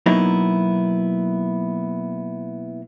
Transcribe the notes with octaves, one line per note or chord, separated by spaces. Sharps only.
B2 F#3 A#3 B3 D#4 E4